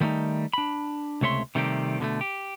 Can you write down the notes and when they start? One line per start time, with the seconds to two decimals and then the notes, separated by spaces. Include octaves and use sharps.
0.01 D#3 G3 A3 C4 D#4
0.53 D4 B5
1.21 C#2 C3 A3 C#5 E5 C6
1.55 C3 D#3 G3 A3 C4 G4
2.00 B2 D3 G#3 A3
2.21 G4